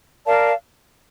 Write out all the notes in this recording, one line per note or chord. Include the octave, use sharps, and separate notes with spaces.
A#4 D5 F5 A5